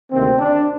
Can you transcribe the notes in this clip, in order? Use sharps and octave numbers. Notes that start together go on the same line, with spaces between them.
D2 C3 D#3 A#3 C4
D4